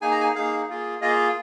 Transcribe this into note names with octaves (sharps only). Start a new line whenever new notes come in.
A#3 D#4 G#4 G#5
A#5
G#5
A#3 D#4 G#4 F5
A#3 F4 G#4
A#3 F4 G#4 D#5